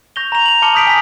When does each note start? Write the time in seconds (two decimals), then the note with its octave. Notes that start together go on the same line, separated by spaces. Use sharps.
0.16 C#6 G6 A#6 F7 G7
0.32 A#5 F7
0.46 F7 F#7
0.62 A5 C6 D6 F6 C#7 G7
0.75 D#6 G6 B6 D7 F#7
0.87 G#5 B6